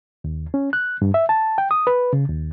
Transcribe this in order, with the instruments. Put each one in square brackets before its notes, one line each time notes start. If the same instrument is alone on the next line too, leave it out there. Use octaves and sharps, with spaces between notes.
[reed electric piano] D#2
C#4
F#6
G2
E5
A5
G5
D#6
B4
C#3
D#2